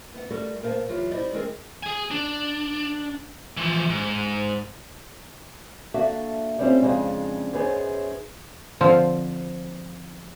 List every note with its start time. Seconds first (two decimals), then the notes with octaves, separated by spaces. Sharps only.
0.14 B3 F5 F#5
0.30 G3 A3 F#4 G4 A4 A#4
0.62 A#2 B3 A#4 C5 F5 A5
0.88 E2 F#3 E4 F4 G4
1.11 D#4 E4 G4 C5 D5 D#5
1.33 G#3 B3 C4 G#4 A#4
1.83 G#4 G#5
2.11 D4
3.57 E3 F3
3.90 G#2
5.94 A#3 D4 F#4 A4 E5 F#5
6.59 G3 A3 C4 C#4 E4 F4
6.81 F2 C#3 G#3 D4
7.53 F#2 B3 D#4 G#4 C5 C#5
8.81 D3 F3 C4 F4